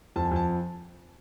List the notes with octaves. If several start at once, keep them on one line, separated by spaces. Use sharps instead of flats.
F2 A5
G#5
F2 A5